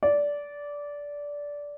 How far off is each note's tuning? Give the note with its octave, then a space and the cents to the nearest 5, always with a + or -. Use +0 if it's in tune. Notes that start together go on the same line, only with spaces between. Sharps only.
D5 -15